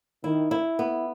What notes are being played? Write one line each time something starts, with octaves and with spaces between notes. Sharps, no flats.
D#3 E4
E4
B3